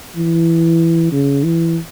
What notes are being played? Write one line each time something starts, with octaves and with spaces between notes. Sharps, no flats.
E3
C#3
E3